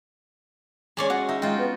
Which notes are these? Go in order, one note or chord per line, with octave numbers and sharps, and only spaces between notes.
G#3 C#4 C#5 D5 G#5
F#4
D#4 E5
G#3 F4 F#4 G5
B3